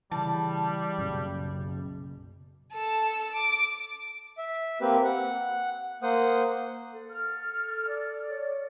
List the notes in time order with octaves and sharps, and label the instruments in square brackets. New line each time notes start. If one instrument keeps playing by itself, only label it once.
[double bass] C#3 [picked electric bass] E3 [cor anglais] G3 [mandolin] A5
[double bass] F#1 B1 [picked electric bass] F#2 C#3
[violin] A4 E6
D6
[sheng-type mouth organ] E5
A#3 C4 G4 B4
F#5
A#3 C5 F#5 D#6
[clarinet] A4
[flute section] F6
D5
[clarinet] C#5